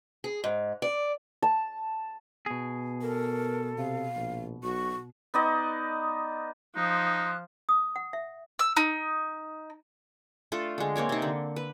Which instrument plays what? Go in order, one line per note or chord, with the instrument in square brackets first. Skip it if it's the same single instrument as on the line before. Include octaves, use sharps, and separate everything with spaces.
[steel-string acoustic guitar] G#4
G#2
D5
[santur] A5
[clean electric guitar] B2 G#4 [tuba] B3
[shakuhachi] A4 [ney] A#4
[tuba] C3 [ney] F5
[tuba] A#1
[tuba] B1 [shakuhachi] F#4 [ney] C#6
[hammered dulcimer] B3 D#4 D5 D#5
[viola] F3 [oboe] D#4 [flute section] C6 D#6 F#6
[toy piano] D#6
F#5
E5
[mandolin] E6
D#4
[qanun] A3 D4 F4 A4
D3 G#3
A#3 C4 C#5 D5
C3 D#4
D3
B4